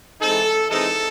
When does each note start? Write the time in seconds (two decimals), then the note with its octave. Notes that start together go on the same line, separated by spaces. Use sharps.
0.21 E3 G#3 C4 D#4 A4
0.70 E3 G#3 C4 D#4 A4